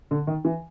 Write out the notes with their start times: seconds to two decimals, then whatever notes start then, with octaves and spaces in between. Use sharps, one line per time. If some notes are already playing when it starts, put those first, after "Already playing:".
0.11 D3
0.27 D#3
0.45 E3